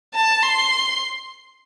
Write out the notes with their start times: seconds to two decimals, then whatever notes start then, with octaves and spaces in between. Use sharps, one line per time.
0.15 A5
0.42 C6